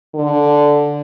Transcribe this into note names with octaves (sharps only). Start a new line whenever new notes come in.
D3